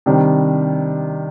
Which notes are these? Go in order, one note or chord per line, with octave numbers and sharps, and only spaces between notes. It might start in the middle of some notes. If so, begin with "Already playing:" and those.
C3 D#3 G3 D4